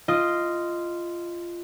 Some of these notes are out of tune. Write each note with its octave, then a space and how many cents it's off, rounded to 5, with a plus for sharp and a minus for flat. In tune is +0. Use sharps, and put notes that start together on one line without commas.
F4 -15 D#5 +0